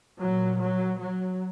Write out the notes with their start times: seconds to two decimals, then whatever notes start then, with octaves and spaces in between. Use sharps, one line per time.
0.20 A#2 F#3
0.60 F#3
1.01 F#3